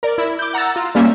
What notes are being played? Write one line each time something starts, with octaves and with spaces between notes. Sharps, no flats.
A#4 D5
E4
D6 G6
F#5 A#5 E6 A6
F4
G3 A#3 C#4 E5